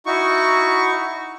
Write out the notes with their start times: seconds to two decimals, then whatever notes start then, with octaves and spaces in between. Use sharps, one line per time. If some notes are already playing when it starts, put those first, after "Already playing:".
0.06 D#4 E4 F#4 C#6